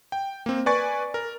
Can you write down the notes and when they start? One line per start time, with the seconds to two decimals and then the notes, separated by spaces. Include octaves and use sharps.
0.12 G5
0.46 A#3 C4
0.66 B4 D5 G#5 C#6 A6
1.14 A#4